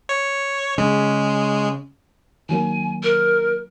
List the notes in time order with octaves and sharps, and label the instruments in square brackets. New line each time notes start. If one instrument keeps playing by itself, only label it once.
[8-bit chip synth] C#5
[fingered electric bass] C#3 [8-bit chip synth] G#3
[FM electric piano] D#3 F#3 A#3 [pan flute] G#5
[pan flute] A#4